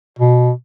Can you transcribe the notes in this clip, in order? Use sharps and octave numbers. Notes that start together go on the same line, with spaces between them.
B2